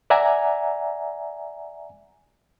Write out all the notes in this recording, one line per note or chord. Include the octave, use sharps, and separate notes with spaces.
D5 E5 F#5 G#5 A#5